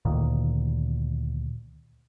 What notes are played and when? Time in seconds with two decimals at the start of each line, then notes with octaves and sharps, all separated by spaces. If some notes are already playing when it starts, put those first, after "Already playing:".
0.05 D2 A#2 D#3